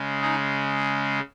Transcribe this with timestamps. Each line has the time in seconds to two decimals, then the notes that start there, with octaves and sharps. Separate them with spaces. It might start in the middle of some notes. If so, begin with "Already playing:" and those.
Already playing: C#3 G#3
0.21 D#4 G#4